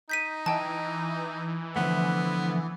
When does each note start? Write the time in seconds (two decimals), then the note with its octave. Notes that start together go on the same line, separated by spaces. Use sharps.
0.09 D#4 G6 B6 D#7
0.46 E3 D#5 G5 A5
1.76 D3 F3 A3 B3